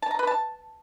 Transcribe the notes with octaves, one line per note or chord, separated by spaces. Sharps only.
A5
A#5
B4
A5